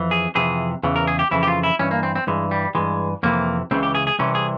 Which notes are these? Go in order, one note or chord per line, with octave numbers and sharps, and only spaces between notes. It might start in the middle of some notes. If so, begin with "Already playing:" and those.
Already playing: F2 E3
G#4
F2 C3 E3 G#4
E2 C#3 E3
A#4
G#4
G4
F2 C#3 E3 E4
G4
F4
E4
G2 E3 C#4
A#3
C4
C4
G2 E3 G#3
G3
G2 E3 G#3
F2 C3 E3 A#3
C#2 C#3 E3 C4
G4
G#4
G#4
C2 C3 E3 C#4
G#4